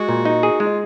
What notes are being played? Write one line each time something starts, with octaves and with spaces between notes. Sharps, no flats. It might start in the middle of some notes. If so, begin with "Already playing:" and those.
Already playing: G#3 F#4
A#2
D#4
G#4
G#3 F4